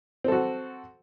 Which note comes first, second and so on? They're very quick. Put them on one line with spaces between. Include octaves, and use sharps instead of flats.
C4 A4 F#4